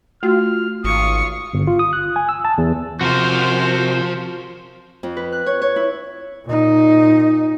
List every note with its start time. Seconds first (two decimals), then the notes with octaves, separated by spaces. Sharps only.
0.23 A3 F4 F#4 F6
0.84 G#1 F4 C#6 D#6
1.54 G1
1.67 F4
1.79 D#6
1.93 F#6
2.16 G#5
2.29 E6
2.45 A5
2.58 E2
3.01 C3 F3 F#4 A#4 C5
5.03 F2
5.17 B4
5.32 F#6
5.46 C#5
5.62 C#5
5.76 E4
6.45 A#2 D#4